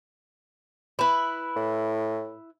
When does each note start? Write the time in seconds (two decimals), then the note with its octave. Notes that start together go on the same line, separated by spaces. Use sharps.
0.99 E4 B4
1.56 A2